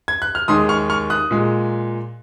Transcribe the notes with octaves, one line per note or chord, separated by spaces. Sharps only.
G#6
F#6
F6
D#2 D#3 G#3 C6 D#6
C#6 F6
C#6 F6
D#6 F#6
A#2 G#3